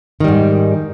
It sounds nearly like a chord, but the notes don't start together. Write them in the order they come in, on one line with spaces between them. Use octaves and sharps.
D#3 G3 G#2